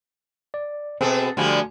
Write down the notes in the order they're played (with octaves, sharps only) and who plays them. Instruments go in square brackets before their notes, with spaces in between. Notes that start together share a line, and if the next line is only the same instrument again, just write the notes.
[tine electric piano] D5
[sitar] B2 G#4 A4 [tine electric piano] C4
[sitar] D3 F3 G3 [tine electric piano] A3 F#4 G#5